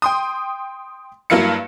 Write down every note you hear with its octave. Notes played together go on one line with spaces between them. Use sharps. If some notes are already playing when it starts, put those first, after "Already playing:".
G5 C6 D#6
G2 F#3 A#3 E4 F5 C#7